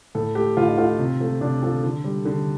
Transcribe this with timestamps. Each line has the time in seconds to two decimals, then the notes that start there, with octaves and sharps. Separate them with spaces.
0.15 A2 A4
0.35 A3 G4
0.57 A2 F4
0.67 D#4
0.78 A3 F4
0.99 C3
1.20 F3 A3
1.41 C3 D4
1.62 F3 A3 A4
1.83 D3
2.04 G3
2.25 D3